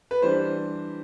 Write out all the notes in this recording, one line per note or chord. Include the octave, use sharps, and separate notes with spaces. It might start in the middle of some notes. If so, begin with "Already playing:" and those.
B4
E3 G3 D4 C5